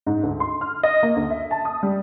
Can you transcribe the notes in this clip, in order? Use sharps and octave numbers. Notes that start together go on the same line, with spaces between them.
G#2
D2
C6
F6
D#5
A#3
D2
E5
A5
D#6
G3